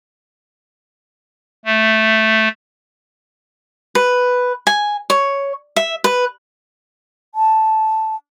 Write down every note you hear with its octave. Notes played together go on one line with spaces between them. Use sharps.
A3
B4
G#5
C#5
E5
B4
A5